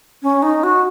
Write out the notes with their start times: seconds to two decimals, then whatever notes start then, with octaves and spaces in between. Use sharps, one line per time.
0.23 C#4
0.42 D#4
0.63 F#4